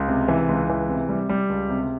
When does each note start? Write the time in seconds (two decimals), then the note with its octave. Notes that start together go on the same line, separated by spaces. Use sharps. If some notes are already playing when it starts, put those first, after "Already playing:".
Already playing: C#2
0.08 C3
0.28 E3
0.49 C#2
0.69 E3
0.89 C3
1.09 G3
1.29 G3
1.49 C#2
1.70 C3